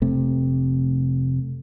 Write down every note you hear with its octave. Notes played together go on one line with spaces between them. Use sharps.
F1 C3 A3